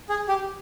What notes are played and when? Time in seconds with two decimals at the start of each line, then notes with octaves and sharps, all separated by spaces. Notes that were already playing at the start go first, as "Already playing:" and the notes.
0.10 G#4
0.28 G4